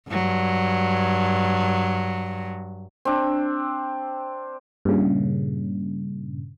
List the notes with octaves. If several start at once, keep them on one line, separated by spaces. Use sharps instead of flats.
G2 F#3
C4 D4
G2 A#2 C#3